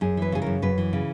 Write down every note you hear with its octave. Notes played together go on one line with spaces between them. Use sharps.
F#2 G#4
E3 B4
C#3 G#4
F#2 A#4
F#2 B4
E3
C#3